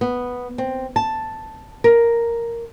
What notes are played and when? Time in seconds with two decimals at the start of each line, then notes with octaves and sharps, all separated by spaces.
0.01 B3
0.58 C4
0.96 A5
1.84 A#4